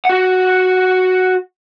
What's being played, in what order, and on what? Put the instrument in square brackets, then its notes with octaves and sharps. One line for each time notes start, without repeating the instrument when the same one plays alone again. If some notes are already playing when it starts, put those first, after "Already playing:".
[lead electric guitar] F#4 F#5